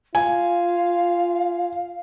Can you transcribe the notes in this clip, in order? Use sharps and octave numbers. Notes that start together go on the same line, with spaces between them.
F4 F5 G#5